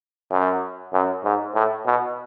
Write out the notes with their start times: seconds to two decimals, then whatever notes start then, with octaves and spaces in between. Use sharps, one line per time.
0.31 F#2
0.93 F#2
1.25 G#2
1.55 A2
1.86 B2